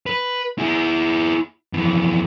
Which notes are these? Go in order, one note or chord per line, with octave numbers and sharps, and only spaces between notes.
B4
E4 G#4
F2 E3